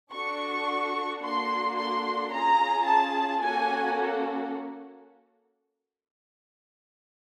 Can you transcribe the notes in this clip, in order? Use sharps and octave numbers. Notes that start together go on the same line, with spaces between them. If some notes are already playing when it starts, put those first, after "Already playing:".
D4 F#4 A4 C#6
A#3 D4 F#4 A4 C6
C6
C#4 F4 G#4 A#5
A5
A#3 C#4 F#4 A4 G#5